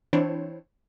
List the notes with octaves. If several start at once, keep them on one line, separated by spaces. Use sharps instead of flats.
E3 C4 D4 E4 C5 C#5